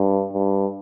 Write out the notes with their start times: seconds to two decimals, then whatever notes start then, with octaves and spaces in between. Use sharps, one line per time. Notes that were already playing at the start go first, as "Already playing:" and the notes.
Already playing: G2
0.33 G2